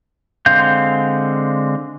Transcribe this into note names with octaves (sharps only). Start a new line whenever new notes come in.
D3 G#3 C4 F5 G6